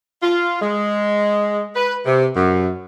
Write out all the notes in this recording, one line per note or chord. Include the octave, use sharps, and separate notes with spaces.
F4
G#3
B4
C3
F#2